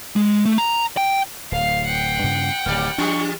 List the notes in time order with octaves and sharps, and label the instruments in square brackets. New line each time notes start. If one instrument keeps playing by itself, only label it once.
[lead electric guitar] G#3
A3
A#5
G5
[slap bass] D1 [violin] F5 [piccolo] C7
[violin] F#5 G5
[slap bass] G2 C#3
[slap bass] D1 [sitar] D#2 D5 [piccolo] F6
[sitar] E3 G3 G#3 [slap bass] D4 [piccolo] C#6